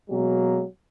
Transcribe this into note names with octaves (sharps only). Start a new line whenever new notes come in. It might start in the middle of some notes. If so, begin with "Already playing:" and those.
B2 F#3 G#3 A#3